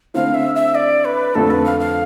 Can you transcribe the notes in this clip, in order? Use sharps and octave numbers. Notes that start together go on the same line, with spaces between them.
D3 A3 C4 E4 F5
E5
E5
D5
B4
F2 D3 F3 A3 C4 A4
B4
F5
F5